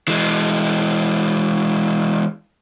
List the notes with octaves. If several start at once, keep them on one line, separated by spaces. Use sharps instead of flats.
E3 G#3